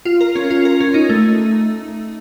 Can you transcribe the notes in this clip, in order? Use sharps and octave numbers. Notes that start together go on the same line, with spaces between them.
F4
A#4
C#4
F4
A#4
C#4
D#4
A3